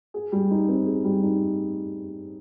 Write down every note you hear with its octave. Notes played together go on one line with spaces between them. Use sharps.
G#4
G3
D#4
C4
G#4
G3
D#4